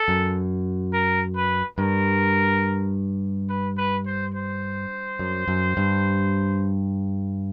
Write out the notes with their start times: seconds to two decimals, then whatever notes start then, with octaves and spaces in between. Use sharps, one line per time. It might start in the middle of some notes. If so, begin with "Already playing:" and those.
Already playing: A4
0.08 F#2
0.93 A#4
1.36 B4
1.78 G2 A#4
3.49 B4
3.77 B4
4.06 C5
4.34 C5
5.19 F#2
5.48 F#2
5.77 G2